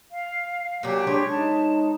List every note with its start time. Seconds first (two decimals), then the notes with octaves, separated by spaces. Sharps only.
0.12 F5
0.83 A#2 F#3 D4 G4
1.07 G#3 D4 C#5
1.29 D#4 A5